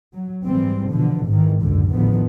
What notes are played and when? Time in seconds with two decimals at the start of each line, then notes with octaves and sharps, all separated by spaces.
0.13 F#3
0.43 G#2 E3 G3 C4
0.90 B2 D3 E3 F3
1.26 G#1 G#2 D#3 E3
1.61 C#2 F#2 A2 D3
1.92 A1 E2 D3 D#3 F3 B3